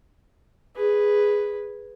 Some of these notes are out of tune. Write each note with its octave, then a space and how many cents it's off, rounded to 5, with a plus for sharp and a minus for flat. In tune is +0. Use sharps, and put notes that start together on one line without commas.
G#4 -5 B4 +0